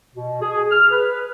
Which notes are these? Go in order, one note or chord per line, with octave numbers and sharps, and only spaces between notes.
B2
G#4
F6
B4